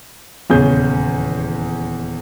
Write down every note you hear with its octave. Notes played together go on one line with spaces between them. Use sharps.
D#1 E2 C#3 G#4 C#5 G6